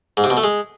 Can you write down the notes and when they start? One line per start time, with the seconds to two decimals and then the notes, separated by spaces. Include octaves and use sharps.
0.17 G#2
0.24 C3
0.30 B2
0.37 A3
0.43 G#3